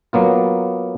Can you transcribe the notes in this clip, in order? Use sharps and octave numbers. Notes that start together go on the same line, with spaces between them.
F#3 A#3 B3 F4